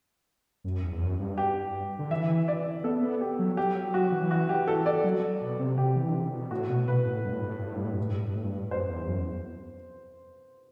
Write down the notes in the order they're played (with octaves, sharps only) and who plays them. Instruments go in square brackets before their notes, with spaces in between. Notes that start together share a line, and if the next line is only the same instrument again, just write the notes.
[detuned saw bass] F#2
E2
E2
F#2
G2
[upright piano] G4
[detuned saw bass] D3
[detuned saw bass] E3 [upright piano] E5
[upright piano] D5
[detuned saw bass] B3 [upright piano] A4
[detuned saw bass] B3
[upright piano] G4
[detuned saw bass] F#3
[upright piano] G4
[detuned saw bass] F#3
[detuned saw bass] F#3 [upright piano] F#4
[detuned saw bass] E3
[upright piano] F#4
G4
A4
D5
[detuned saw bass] F#3
B2
C3
[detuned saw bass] C3 [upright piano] G4
[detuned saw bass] E3
D3
C3
B2
[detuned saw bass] A2 [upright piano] F#4
[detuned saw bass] B2
[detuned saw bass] B2 [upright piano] B4
[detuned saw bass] A2
G2
A2
G2
A2
G2
A2
G2
A2
G2
A2
G2
A2
G2
A2
G2
[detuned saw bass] F#2 [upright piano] C5
[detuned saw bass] E2
F#2
E2